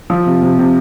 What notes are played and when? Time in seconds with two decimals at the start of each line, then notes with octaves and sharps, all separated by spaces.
0.10 F3
0.26 C3
0.42 C3
0.59 C3